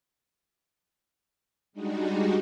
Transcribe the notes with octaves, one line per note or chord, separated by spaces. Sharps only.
G3 G#3 D4 D#4 F#4